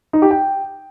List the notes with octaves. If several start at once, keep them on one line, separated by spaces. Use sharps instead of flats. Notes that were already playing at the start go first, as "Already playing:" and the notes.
D#4
G4
G5